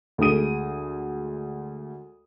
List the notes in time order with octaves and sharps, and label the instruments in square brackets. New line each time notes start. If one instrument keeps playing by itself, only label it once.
[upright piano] D2 G#3 A4 D#6 D#7